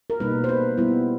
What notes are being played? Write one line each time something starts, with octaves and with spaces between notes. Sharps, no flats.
A#4
B2 G3 A#3 D#4 B4
C5
B4
G3 B3 E4